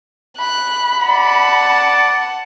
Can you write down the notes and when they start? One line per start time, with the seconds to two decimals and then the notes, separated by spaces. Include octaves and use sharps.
0.39 B5 F#6
1.07 D5 F#5 A5